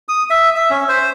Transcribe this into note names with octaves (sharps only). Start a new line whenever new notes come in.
D#6
E5
E5
C#4
C5